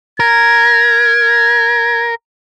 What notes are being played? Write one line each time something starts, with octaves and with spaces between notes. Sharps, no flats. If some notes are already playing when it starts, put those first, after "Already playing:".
A#4 G#6